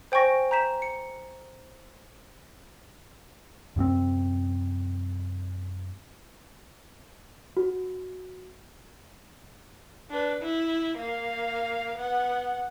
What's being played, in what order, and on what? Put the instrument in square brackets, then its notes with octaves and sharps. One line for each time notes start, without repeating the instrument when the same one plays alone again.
[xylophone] C5 G5 G#5 C#6 A#6
A#5 G6 B6 E7
C#7
[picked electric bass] F#2 C3 B3 C4
[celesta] F#4
[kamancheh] D4 B4
E4
A#3 F5
B3 F#5